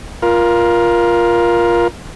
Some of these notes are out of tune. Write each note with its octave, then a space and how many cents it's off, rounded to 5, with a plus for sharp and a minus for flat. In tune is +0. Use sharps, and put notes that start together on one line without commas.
F4 -5 A#4 +20